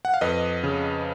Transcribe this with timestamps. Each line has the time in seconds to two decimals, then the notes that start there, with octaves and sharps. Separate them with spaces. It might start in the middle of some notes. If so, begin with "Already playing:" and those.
0.05 F#5
0.14 F5
0.21 F2 B4 D#5
0.64 C#3